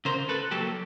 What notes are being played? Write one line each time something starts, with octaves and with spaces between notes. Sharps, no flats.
C#3 A#4 C5
A4 B4
F#3 A#3 G4 A4